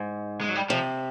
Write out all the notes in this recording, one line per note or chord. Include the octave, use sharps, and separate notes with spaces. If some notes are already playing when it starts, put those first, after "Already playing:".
Already playing: G#2
G#3
F#3
G3
C3 F3